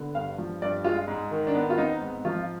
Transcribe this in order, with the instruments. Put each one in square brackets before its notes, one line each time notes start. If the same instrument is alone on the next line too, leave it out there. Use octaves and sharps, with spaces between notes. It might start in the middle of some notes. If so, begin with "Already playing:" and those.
Already playing: [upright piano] D3 B3
G2 F5
F3
G2 D5
G#3 F4
G#2
D#3
D4
B3
F4
C4 D#4
G#2
F3 F4